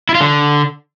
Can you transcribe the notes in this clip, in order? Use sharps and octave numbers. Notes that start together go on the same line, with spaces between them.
E4
F4
D3